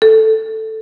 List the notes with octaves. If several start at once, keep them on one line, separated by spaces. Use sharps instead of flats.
A4